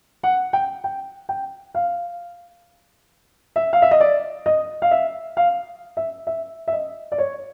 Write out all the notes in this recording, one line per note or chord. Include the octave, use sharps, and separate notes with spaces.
F#5
G5
G5
G5
F5
E5
F5
E5
D#5
D5
D#5
F5
E5
F5
E5
E5
E5
D#5
D5
C#5